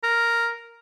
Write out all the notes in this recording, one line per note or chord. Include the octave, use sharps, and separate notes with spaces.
A#4